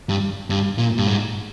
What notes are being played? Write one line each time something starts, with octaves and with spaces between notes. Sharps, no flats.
G2
G2
A#2
G2
G#2